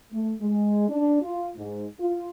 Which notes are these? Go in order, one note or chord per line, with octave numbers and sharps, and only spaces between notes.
A3
G#3
D4
F4
G#2
F4